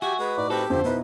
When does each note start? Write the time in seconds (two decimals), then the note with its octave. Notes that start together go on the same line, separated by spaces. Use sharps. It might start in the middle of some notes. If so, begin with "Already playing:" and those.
0.02 F#4 G4 E5 G#5
0.19 G#3 B4
0.37 A2 D#4 D5
0.50 C4 F#4 G4 A4 B4
0.70 F2 D3 C5
0.84 B2 D#4 E4 B4